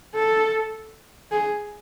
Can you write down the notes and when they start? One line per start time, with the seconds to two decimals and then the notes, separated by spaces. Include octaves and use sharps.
0.15 A4
1.32 G#4